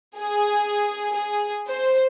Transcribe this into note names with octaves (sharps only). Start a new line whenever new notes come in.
G#4
G#4
C5